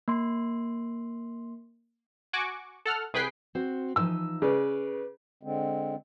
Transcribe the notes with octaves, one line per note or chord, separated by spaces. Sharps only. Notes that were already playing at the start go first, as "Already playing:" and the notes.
A#3 C6
F#4 G#5 C#6 D6
A4 F#5 F6
C2 G#4 B4 G5 B6 C7
C4 F#4 C5
E3 F3 D#4 E6
C#3 B4 D5
D3 G#3 C4